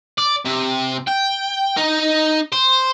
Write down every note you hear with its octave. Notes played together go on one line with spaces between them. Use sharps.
D5
C3
G5
D#4
C5